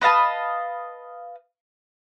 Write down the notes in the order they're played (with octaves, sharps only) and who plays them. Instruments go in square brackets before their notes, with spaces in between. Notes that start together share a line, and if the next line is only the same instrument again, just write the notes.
[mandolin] B4 D#5 F5 A5